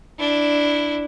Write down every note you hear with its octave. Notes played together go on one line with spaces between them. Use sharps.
D4 E4